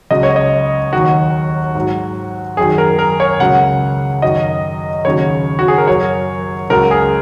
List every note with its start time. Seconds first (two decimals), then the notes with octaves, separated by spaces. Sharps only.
0.11 C#2 C#3 F#3 D#5
0.23 C#5
0.36 D#5
0.93 D#2 D#3 F#3 F#4
1.75 G#2 F#3
2.57 F#2 D#3 F#3 G#4
2.78 A#4
2.99 A#4
3.20 C#5
3.40 C#2 C#3 F#3 F#5
4.22 F#2 D#3 F#3 D#5
5.05 D#2 C#3 F#3 C#5
5.59 F#4
5.68 G#4
5.78 A#4
5.87 F#2 F#3 C#5
6.70 C#2 C#3 F#3 A#4
6.91 G#4